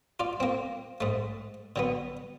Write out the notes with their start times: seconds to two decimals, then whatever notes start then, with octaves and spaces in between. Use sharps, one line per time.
0.20 F4 D5
0.40 A#3 C4
1.01 G#2 A3
1.76 D3 F#3 B3